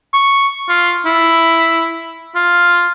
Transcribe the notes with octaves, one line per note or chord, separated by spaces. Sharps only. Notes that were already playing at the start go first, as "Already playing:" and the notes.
C#6
F4
E4
F4